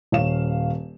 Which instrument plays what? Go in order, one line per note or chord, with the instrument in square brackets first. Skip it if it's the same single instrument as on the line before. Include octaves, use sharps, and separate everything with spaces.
[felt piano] D#1 C#5 F5 E7